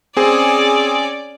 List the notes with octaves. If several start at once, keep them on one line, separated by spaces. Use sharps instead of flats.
C4 C#4 G#4 D5